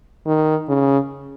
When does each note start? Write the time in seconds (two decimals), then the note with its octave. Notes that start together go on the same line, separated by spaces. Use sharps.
0.27 D#3
0.69 C#3